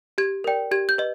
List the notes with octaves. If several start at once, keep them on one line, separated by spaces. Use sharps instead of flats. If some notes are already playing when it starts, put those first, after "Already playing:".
G4 G#6
A#4 D5 G5
G4 G#6
G6
B4 D#5